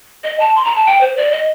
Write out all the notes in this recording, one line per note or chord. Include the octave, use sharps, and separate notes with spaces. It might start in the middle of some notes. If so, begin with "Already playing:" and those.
D#5
A5
C6
A#5
A5
G5
C5
D5
D#5